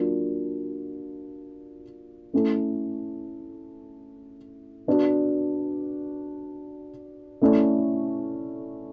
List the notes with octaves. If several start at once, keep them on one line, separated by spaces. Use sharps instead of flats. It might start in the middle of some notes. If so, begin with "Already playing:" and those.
Already playing: F#3 A#3 D4 F4
A3 C#4 E4 A4
B3 D4 F#4
A3 C#4 E4 A4 D5